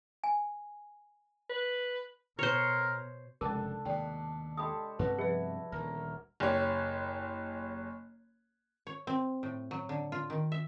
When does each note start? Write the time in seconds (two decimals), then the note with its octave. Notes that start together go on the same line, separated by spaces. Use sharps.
0.24 G#5
1.49 B4
2.39 B2 A#4 C5 C#5
3.41 F1 C#2 C3 G#3 D4 A4 A#4 A5
3.85 D#2 B2 D5 G5
4.57 G#3 G4 A4 B5 D#6
4.99 G2 C3 B3 F#4 B4
5.19 F3 E4 G#4 B4
5.72 D#1 D2 A#4
6.40 F#1 G4 C#5
8.87 C#5
9.07 C4
9.43 A2
9.71 F#3
9.89 D3
10.12 F4
10.30 D#3
10.52 E5